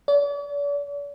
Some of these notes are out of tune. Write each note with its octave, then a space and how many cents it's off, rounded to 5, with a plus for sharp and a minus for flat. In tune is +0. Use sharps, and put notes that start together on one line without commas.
D5 -45